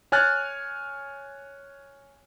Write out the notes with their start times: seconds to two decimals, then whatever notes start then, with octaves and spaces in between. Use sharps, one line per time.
0.12 C#5 G#5 F6 F#6 A6